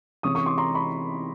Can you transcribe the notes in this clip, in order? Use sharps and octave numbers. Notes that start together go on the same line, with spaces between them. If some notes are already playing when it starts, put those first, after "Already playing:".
C3 E3 G#3 C#4 C#6 D#6
C#6 D#6
C6 D6
A#5 C6
B5 C#6